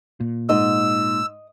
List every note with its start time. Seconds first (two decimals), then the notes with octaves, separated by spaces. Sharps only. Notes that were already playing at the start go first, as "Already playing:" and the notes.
0.20 A#2
0.49 G#2 D#5 E6